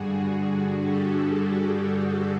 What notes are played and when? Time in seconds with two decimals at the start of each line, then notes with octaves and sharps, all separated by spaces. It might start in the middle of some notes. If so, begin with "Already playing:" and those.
Already playing: G2 D3 G3 F#4 G#4
0.78 G4 A4